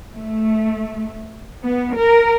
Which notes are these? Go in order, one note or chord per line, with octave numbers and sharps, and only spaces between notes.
A3
B3
A#4